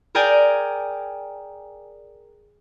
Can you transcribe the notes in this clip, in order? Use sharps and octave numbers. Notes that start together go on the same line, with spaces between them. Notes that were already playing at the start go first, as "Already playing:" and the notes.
G#4 A#4 D5 G5 G#5